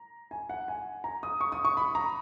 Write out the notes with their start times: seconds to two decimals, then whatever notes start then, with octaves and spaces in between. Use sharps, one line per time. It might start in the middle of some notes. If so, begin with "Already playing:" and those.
Already playing: A#5
0.31 G#5
0.49 F#5
0.68 G#5
1.04 A#5
1.23 D#6
1.41 C#6
1.52 D#6
1.65 C#6
1.77 B5
1.95 A#5